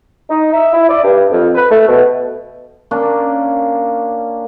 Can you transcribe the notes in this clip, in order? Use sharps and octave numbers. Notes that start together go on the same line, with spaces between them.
D#4
E5
E4
D5
G2
F2
B4
A3
B2
A#3 C#4 D4